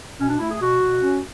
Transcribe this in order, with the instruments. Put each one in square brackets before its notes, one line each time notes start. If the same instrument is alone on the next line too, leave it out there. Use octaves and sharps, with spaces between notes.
[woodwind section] B2 C#4
D4
A3 E4
G#4
B2 F#4
B2
C#4